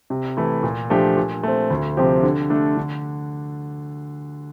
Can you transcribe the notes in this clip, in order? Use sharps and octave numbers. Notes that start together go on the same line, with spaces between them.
C3
E3 A3 E4
A#2
F3 A3 D4 G4
A#2
A3 C4
D2
C3 F3 C4 G4
D3
A3 D4 A4
D3